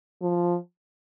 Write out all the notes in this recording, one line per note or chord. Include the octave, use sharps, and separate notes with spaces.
F3